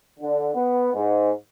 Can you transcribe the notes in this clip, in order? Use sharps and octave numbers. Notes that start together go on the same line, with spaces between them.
D3
B3
G#2